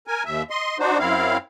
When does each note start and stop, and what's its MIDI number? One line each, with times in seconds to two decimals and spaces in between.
0.07 0.23 70
0.07 0.23 80
0.25 0.43 39
0.25 0.43 76
0.50 0.77 75
0.50 0.77 84
0.79 0.98 62
0.79 0.98 63
0.79 0.98 66
0.79 0.98 72
0.99 1.37 42
0.99 1.37 60
0.99 1.37 64
0.99 1.37 77